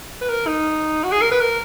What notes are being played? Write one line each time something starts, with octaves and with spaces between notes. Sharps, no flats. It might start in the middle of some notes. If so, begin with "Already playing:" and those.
B4
A#4
D#4
F#4
G#4
A#4
B4
A#4